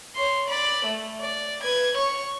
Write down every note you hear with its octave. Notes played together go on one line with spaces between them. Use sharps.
C#5 C6
D5 B5
A3
D5
B4 G#6
C#5 C#6